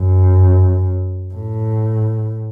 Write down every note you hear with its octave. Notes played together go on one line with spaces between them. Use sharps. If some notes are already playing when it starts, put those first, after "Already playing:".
Already playing: F#2
A2